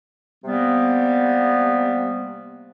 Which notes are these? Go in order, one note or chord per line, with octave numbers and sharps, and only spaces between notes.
C3 G3 A#3 B3